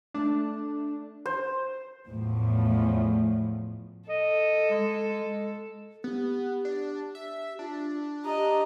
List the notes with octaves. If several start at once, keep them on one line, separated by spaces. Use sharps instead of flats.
A3 D4
C5
E2 A2 F3
A4 D#5
G#3
G#3
B3 G4
D4
E5
D4 F4
G4 D#5 A#5